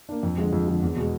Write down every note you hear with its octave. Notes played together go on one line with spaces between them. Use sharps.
A#3 D4
F2
D3 F3 G#3
F2
D3 F3 G#3
E2
B2 G#3